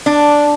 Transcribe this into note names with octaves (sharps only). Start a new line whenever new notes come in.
D4